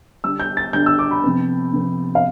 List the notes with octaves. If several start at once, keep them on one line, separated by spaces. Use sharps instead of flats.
D3 G3 D4 E6
G6
A6
D3 G3 D4 G6
E6
D6
B5
C3 F3 B3
C3 F3 B3
F5